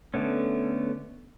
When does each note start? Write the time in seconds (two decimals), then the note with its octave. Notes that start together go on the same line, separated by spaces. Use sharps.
0.14 D3 A3 B3 C#4